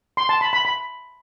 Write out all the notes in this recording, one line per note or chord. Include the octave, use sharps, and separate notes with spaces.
C6
A5
B5
B5
B5